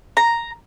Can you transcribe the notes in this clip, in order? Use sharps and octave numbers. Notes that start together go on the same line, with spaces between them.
A#5